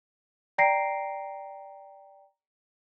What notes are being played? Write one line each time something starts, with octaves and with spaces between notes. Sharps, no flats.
D5 G5 A#5 A#6 C7 D7